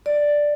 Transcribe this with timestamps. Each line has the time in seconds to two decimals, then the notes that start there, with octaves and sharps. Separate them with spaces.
0.06 D5